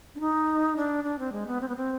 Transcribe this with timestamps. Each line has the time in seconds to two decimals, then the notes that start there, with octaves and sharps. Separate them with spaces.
0.15 D4
0.20 D#4
0.76 D4
1.04 D4
1.19 C4
1.32 G#3
1.47 B3
1.61 C4
1.68 B3
1.76 C4